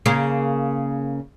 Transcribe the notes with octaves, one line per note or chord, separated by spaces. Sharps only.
C#3 A#3